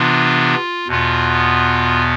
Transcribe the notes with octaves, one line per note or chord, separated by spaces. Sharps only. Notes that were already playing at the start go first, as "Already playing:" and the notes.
Already playing: C3 E3 B3 D4 F4
E2 B2 B3 F4